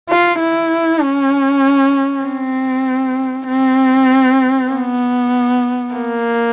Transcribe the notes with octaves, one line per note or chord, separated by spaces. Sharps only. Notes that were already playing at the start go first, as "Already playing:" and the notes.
F4
E4
C#4
C4
C4
B3
A#3